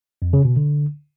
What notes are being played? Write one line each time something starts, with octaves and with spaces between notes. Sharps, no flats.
F2
C#3
B2
D3